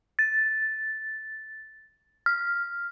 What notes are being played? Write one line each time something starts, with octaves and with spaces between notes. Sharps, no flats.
A6
F6